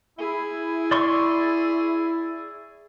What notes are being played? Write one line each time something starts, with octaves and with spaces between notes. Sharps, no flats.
E4 G#4
D5 C6 C#6